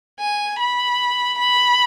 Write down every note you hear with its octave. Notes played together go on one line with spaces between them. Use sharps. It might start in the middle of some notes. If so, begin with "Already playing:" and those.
G#5
B5
B5